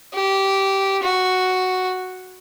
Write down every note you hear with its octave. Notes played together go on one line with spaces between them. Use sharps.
G4
F#4